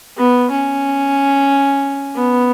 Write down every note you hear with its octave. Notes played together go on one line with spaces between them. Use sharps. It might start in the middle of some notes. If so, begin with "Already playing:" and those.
B3
C#4
B3